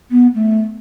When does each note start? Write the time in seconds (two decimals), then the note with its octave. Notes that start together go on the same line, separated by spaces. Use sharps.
0.11 B3
0.34 A3